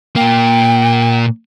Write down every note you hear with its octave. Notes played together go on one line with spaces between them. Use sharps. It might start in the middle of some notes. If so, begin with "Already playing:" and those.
A#2 A#3 G5